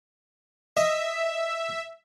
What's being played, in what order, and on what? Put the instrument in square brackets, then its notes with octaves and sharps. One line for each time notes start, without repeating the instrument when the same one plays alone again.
[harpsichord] D#5 [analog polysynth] E5